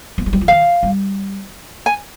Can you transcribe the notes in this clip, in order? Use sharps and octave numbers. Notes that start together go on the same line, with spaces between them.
A#3
G#3
G3
F3
D#3 F5
G3
G#5